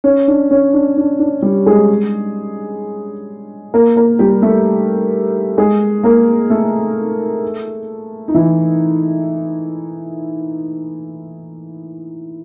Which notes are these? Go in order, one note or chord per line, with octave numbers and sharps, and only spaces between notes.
C#4
D4
C#4
D4
D4
D4
G3 G4
G#3 G#4
A#3 A#4
A#3 A#4
G3 G4
A3 A4
G#3 G#4
A#3 A#4
A3 A4
D#4
E3 E4